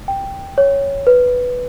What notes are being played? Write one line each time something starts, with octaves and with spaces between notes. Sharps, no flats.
G5
C#5
B4